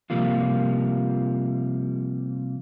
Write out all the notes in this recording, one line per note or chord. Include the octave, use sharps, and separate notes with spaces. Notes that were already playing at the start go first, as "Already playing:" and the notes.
C3 F3 G3 A#3 F4